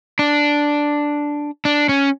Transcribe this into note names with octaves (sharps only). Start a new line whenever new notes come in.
D4
D4
C#4